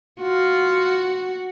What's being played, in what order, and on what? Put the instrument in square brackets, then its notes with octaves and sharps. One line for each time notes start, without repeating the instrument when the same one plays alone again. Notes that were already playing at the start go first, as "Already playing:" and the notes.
[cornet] F4 [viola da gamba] F#4